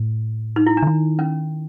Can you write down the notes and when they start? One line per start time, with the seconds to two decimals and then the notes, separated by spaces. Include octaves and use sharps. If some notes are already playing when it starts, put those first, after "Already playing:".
Already playing: A2
0.56 D#4
0.66 E4
0.77 D4
0.82 D3
0.87 D#3
1.19 C#4